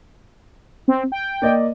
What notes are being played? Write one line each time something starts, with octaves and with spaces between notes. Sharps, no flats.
C4
G5
A#3 D5 D#5